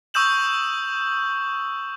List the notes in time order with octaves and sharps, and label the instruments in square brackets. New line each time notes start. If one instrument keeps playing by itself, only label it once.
[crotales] C#6 D#6 E6 G6 E7 F#7